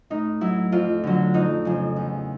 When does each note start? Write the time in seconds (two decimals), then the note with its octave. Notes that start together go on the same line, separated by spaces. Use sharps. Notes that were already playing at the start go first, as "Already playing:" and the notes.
0.10 A2 D#4
0.41 F#3 E4
0.72 F2 F4
1.04 D3 F#3
1.34 F2 D#4
1.65 C#3 F3
1.96 E2